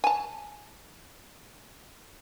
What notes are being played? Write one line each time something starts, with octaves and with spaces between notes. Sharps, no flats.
G#5 A5